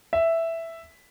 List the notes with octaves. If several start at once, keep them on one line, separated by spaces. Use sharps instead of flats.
E5